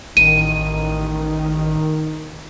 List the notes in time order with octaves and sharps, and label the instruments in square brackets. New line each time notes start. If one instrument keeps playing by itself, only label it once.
[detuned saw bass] A1 [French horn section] D#3 [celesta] D#7